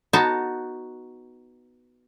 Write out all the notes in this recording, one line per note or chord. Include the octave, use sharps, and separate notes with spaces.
B3 D#4 F#4 A5